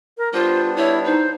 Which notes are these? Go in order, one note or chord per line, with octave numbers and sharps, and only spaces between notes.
A#4
G3 B3 D4 F4 C5
E4 C#5
D#4 C5